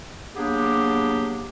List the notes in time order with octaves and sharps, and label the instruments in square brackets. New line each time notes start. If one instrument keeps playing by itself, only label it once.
[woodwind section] F#3 A#3 B3 D4 G4 G#4